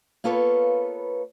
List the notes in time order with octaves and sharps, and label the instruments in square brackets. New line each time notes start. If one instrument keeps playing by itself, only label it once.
[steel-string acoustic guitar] A#3 B3 F4 A4 B4 C#5